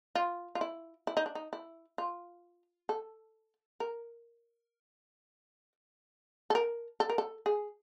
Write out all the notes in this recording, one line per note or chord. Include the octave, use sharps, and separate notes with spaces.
F4
F4
E4
E4
D#4
D4
D#4
E4
F4
A4
A#4
A4
A#4
A4
A#4
A4
G#4